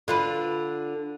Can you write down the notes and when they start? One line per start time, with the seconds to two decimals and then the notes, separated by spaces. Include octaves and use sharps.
0.08 D3 F4 B4